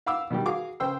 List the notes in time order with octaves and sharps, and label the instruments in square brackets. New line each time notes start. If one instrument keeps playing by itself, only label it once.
[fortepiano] F5 F#5 B5 D6 E6
B2 D#3 G3 G4
F#4 G#4 F5 D6
C#3 C5 G5 C6 E6